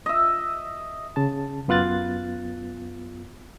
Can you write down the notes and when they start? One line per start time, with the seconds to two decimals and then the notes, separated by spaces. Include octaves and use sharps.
0.06 D#5 E5
1.16 C#3 A5
1.68 F#2 B3 F4 F#6 A6